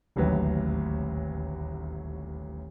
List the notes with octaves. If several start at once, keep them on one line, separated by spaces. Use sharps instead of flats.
D#1 A1 D2 F#3 B4 G5